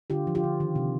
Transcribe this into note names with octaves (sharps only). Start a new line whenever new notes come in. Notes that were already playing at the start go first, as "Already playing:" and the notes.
D3 F4 G4
F3
F4 G4
D3
D#3
C3